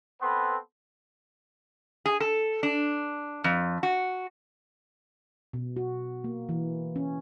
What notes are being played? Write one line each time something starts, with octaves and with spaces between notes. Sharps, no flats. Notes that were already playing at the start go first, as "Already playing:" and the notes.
B3 C4 A4 B4 C6
G#4
A4
D4
F2
F#4
B2
F#4
A#3
E3
C#4